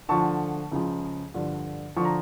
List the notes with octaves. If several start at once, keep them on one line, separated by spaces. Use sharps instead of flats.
D2 D3 F3 A5 C#6
C#2 C#3 F3
G2 D3 F3
D3 F3 C#6
A#5